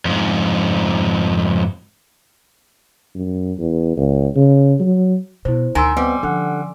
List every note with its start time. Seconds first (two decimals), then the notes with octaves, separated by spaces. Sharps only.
0.05 F2 G#2
3.15 F#2
3.58 E2
3.97 C#2
4.36 C#3
4.80 F#3
5.45 B2 E4 C5
5.75 D2 D#3 G#5 A#5 C6 E6
5.97 G3 B3 C4 D#5
6.23 D3 F3 C#4 F#5